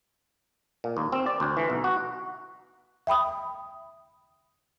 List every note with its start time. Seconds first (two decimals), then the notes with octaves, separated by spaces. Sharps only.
0.84 A#2
0.97 D#2
1.12 C4
1.26 D5
1.40 D2
1.57 E3
1.70 B1
1.84 F#4
3.07 E5 G5 B5 D#6